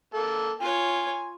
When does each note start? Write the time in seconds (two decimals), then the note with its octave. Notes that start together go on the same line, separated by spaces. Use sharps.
0.14 A#3 A4
0.61 F4 C#5 G#5